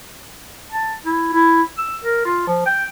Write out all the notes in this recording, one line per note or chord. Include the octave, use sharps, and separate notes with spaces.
A5
E4
E4
E6
A#4
F4
F3
G5